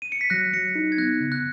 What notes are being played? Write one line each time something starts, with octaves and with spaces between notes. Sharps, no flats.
D#7
C#7
B6
F#3 F#6 A#6
F#3 A#6 C#7
D#4
G#6
B3 F#6 A#6
C#3
F#6